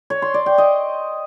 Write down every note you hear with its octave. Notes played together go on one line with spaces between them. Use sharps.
C#5
C6
D5
G5
D#5